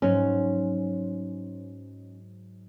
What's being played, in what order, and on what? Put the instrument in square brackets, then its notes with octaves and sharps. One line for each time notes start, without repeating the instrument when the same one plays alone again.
[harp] G#2 F#3 [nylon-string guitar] C#4